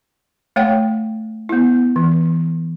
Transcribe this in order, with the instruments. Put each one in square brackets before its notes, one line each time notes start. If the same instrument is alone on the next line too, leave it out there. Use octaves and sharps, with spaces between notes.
[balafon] A3 C#5 F#5 G5
B3 E4
E3